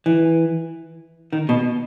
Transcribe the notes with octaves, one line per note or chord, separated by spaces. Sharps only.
E3
D#3
B2